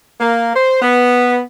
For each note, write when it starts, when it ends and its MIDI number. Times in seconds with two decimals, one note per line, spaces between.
0.20 0.53 58
0.55 0.81 72
0.82 1.40 59